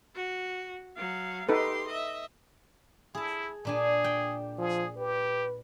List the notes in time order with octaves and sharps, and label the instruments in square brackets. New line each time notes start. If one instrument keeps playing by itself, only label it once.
[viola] F#4
F#3 F5
[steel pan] D#4 A4 B4 [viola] G4 C6
[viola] D#5 E5
[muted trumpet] E4 [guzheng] G#4 A5
[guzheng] A#2 D4 G#5 [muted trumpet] G#4
[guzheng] G5
[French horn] F3 [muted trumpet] G#4
[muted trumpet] G4 [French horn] B4